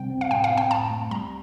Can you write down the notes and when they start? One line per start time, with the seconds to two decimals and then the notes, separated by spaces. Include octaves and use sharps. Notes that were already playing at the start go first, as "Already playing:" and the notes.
Already playing: C3 G3 C4 G5
0.10 C4
0.21 F5
0.31 A2 G5
0.44 F5
0.51 C4
0.58 G5
0.71 A2 A5
0.91 A3
1.11 G3 A#5